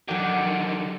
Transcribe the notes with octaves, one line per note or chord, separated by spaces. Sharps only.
D3 D#3 F#3 G4